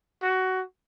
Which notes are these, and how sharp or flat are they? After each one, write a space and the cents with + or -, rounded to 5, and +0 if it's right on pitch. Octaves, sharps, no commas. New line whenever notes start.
F#4 +15